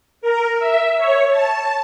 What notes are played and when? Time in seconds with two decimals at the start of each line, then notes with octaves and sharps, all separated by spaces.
0.21 A#4
0.59 E5
0.97 C#5
1.30 A5